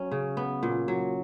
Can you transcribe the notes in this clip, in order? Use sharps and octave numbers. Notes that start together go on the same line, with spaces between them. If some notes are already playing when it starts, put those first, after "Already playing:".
Already playing: F#3 C#4
C#3
B3
A#2
F#3